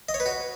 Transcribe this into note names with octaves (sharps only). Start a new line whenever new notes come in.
D#5
C#5
B4
F#4